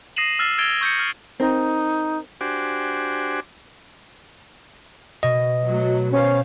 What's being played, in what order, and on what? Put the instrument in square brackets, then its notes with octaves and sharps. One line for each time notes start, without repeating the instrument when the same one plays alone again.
[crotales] D#6 A#6 C7 D#7 E7 F#7
E6 F6 A6 C7 E7
E6 G#6 A6 D7 F7 G7
C#6 G6 A#6 C#7
F6
[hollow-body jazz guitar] C4 A#4 [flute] D#4
[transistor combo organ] D4 F#4 G4 C5 G#5 D6
[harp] B2 [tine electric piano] D#5
[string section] F#3 A3
[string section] B3 C5 F5 [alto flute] C#4